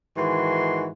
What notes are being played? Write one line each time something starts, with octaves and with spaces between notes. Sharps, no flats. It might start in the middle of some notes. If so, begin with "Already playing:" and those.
G#2 D#3 E3 F#4 C6